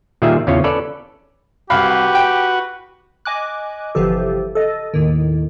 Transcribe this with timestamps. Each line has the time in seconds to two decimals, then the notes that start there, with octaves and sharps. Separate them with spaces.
0.22 A#2 D#3 G3 F4 G#4 E5
0.47 E2 C#3 C#4 F4 C#5
0.64 C#4 A4 B4 C#5 D5
1.70 C2 F#4 G4 B4 F5 B5
2.15 G5
3.25 D#5 G#5 D6 F#6
3.95 G1 C3 E3 F3 G4 A4
4.55 A4 D#5
4.94 D#2 A2 D#3